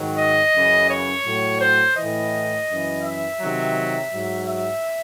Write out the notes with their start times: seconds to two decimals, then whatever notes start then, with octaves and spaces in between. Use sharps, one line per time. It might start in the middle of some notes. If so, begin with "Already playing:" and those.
Already playing: G#2 D#3 F#3
0.18 D#5
0.54 F#2 C#3 E3
0.90 C#5
1.25 A2 F#3
1.61 C5
1.97 A2 E3 D#5
2.68 F#2 E3
3.04 E5
3.40 C3 D#3 F#3
4.11 G#2 F#3
4.47 E5